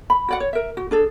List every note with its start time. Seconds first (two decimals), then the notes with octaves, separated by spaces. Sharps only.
0.10 B5
0.28 F#4 D5 F#5
0.40 C#5
0.53 A#4 E5
0.77 F#4
0.91 D4 G#4 A4